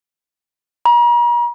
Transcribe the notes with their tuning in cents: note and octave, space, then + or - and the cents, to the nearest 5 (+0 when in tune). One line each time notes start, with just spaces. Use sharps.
A#5 +40